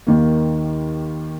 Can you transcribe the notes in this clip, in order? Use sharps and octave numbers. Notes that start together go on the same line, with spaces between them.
D#2 D#3 A#3